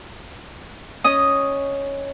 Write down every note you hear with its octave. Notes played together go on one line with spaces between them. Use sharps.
C#4 D#5 D#6